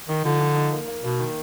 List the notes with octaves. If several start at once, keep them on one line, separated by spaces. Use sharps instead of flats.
D#3 D#4
D3 F3
F3
D#4
A#3
A#3
B2 A#3
D#3